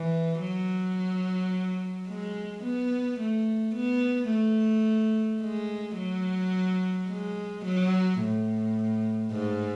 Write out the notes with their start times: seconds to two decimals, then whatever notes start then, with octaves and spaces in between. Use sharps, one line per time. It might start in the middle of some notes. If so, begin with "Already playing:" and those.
Already playing: E3
0.41 F#3
2.08 G#3
2.64 B3
3.19 A3
3.75 B3
4.31 A3
5.42 G#3
5.98 F#3
7.09 G#3
7.65 F#3
8.20 A2
9.32 G#2